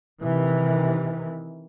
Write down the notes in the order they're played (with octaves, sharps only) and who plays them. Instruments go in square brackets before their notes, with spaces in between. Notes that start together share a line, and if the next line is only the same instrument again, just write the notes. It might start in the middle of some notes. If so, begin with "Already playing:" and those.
[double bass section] C3 D#3 E3